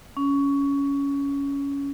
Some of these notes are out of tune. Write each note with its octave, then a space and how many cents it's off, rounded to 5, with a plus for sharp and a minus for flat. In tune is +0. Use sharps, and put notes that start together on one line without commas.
C#4 +15